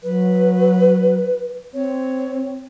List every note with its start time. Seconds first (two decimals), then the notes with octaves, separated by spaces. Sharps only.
0.03 F#3 B4
1.74 C4 C#5